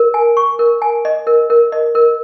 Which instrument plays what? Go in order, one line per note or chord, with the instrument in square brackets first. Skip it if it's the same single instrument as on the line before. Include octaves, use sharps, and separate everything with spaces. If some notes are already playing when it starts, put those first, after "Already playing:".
Already playing: [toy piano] A#4
G#5
C#6
A#4
G#5
D#5
A#4
A#4
D#5
A#4